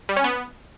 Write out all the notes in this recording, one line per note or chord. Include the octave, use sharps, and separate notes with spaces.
G3
C#4
B3